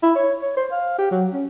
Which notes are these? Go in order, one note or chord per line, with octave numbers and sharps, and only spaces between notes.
E4
C#5
C#5
C5
F5
G4
F#3
C#4